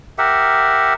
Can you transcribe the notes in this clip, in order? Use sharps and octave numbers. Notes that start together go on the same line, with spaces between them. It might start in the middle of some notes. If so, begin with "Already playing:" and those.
G4 A#4 E5 F#5